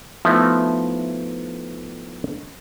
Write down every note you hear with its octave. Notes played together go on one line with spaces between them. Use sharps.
F3 A3 B3 D#4 E4 E5